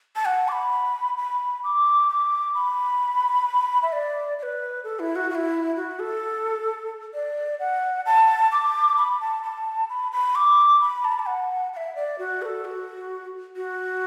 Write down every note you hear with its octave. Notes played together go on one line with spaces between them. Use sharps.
A5
F#5
D6
B5
B5
D6
D6
B5
E5
D5
D5
B4
A4
E4
F#4
F#4
E4
F#4
A4
D5
F#5
A5
D6
B5
A5
A5
B5
B5
D6
B5
A5
B5
A5
F#5
F#5
E5
D5
F#4
B4
A4
F#4
F#4